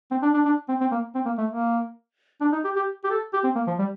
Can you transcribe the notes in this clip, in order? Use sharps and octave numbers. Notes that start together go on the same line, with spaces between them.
C4
D4
D4
D4
C4
C4
A#3
C4
A#3
A3
A#3
D4
D#4
G4
G4
G4
A4
G4
C4
A#3
F3
G3